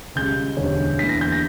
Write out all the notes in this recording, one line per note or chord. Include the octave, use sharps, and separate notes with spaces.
C#2 C#3 G3 G6
E1 D2 D3 G3 C#4
E2 D3 A#3 E4 B6
A#6
G6
A#6